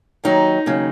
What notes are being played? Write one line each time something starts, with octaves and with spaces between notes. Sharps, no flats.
D#2 D#3 F#3 D#4
D#2 C#3 F#3